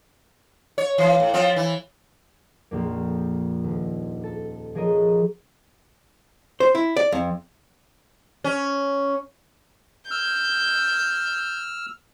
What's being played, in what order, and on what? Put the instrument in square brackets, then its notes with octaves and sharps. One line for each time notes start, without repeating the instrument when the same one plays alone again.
[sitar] C#5
E3
A2
F3 C4
E3
[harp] A#1 F2 A#3
D#1
A4
F3 G#4 A#4 C#5 D#5
[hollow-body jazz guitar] C5
E4
D5
F2
[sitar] C#4
[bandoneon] E6 F6 [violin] G6